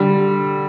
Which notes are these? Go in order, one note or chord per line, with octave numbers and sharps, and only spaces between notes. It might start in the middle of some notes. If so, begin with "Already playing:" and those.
Already playing: D3 G3